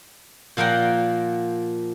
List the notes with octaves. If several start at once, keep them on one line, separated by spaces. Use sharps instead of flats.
A#2 F3 A#4 F#5 G5